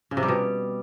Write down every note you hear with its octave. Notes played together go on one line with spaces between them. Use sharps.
C#3
C3
G3
B2